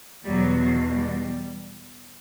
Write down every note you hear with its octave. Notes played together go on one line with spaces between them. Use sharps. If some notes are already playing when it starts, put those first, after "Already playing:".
E2 B2 F#3 G3
F#3
G3